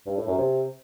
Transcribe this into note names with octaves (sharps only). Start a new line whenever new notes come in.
G2
A2
F#2
C3